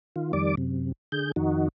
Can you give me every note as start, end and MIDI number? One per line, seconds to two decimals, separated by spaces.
0.16 0.32 51
0.16 0.32 65
0.33 0.55 41
0.33 0.55 51
0.33 0.55 55
0.33 0.55 74
0.33 0.55 86
0.57 0.92 42
0.57 0.92 48
1.12 1.32 50
1.12 1.32 68
1.12 1.32 91
1.36 1.68 41
1.36 1.68 51
1.36 1.68 63
1.36 1.68 66